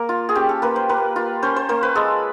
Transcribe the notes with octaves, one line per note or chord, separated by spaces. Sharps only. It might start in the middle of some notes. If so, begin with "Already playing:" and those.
Already playing: A#3 A#4
F4
G#4
C#4 G4
A4
A#3 B4
C5
A#3 B4
F4
C#4 C5
C5
A#3 C5
B4
G#3 A4